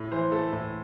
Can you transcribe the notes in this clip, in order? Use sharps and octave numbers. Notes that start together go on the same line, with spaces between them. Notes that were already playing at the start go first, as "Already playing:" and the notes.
Already playing: A2
E3 C5
A3 A4
A2